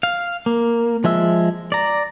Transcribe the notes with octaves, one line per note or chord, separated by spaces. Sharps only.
F5
A#3
F3 G#3 E5 E6
D5 A#5